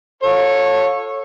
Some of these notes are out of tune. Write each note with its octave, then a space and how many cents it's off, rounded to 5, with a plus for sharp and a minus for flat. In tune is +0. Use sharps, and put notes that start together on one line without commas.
F4 +35 A4 +0 C#5 -15